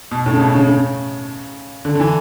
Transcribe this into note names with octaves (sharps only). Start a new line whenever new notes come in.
B2
A2
C#3
B2
C#3
C#3
D3
D3
E3